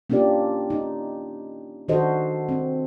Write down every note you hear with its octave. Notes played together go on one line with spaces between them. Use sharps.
A#3 C#4 D4 F4 G4 D5
D#4
D#3 D4 F#4 A4 C5 D#5
C4